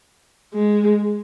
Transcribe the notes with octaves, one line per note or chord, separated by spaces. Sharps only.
G#3